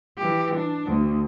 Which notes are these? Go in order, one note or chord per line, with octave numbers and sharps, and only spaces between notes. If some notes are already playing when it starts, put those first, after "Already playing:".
E3 G4
D4
D2